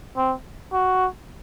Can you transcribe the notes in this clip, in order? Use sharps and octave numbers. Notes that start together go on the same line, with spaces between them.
C4
F#4